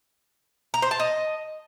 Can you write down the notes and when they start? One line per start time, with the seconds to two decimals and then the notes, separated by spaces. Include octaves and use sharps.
0.74 A#5
0.82 C5
0.91 A5
1.00 D#5